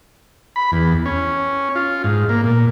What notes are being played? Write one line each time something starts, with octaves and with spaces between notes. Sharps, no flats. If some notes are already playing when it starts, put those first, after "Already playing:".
B5
E2
C#4
F4
G#2
A#3
A#2